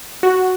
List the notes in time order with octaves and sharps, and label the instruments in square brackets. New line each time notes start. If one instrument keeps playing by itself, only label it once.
[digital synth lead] F#4